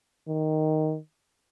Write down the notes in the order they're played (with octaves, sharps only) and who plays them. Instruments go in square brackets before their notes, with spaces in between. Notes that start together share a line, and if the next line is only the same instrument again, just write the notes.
[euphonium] D#3